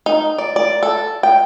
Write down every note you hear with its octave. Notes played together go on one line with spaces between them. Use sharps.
D#4
D5
D5
A4
G5